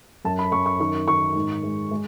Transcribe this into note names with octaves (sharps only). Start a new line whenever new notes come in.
F#2 A5
B5
F#2 C#6
C#6
D#3 C#6
D#3 C#6
G#2
G#3
G#3